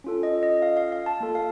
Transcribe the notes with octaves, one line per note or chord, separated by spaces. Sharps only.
C#4 F4 A4
D#5
D#5
F5
F5
F5
A5
A#3 F4 A4
F5